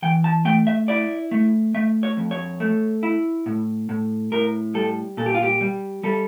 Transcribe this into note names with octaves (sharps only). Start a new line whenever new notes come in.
E3 G5
A5
A3 G5
E5
E4 D5
A3
A3 E5
C#5
F2
C#5
A3
E4
A2
A2
A2 A#4
G3 A4
A#2 A4
G4
F4
G4
G3
G3 A4